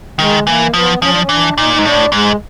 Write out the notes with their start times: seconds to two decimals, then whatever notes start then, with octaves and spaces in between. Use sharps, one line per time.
0.19 D#3 G#3
0.46 E3 A#3
0.74 F3 B3
1.01 F3 C#4
1.11 D4
1.20 C#4
1.29 E3 D4
1.57 A#2 D#4
1.74 G#2 D#4
1.85 A2 D4
2.12 G#2 G#3